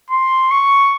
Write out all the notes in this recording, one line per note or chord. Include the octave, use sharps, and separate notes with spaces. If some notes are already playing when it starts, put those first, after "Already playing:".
C6
C#6